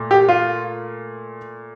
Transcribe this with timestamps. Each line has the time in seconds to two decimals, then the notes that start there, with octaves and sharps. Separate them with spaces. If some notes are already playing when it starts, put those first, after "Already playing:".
Already playing: A#2 A3
0.11 G4
0.28 F4